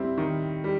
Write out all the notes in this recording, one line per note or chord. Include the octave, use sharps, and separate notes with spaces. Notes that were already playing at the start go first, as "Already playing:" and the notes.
Already playing: G3 C4 E4
D#3
G3